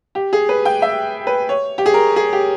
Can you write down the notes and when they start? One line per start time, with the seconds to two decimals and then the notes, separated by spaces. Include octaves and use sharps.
0.15 G4
0.33 G#4
0.49 B4
0.65 G5
0.82 E5
1.27 B4
1.49 C#5
1.78 G4
1.86 G#4
1.94 A#4
2.16 G#4
2.33 G4